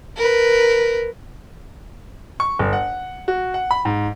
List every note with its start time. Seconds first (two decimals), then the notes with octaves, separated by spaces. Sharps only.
0.17 A#4 B4
2.40 C#6
2.59 G1
2.73 F#5
3.28 F#4
3.54 F#5
3.71 B5
3.85 G#2